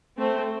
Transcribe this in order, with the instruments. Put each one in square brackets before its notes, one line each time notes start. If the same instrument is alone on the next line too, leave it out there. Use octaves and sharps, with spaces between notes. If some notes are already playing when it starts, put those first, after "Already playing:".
[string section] A3 C4